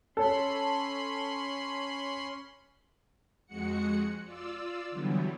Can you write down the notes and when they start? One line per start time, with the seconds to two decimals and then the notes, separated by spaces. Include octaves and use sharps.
0.17 C#4 A4 C#5 B5 C6
3.47 F2 G#3 F#4 F#5 C#7
4.25 F4 D5 E6
4.91 D3 E3 F#3 G3 B3